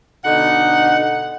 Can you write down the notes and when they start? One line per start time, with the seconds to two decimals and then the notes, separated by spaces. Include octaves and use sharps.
0.24 B2 D3 D#4 F#5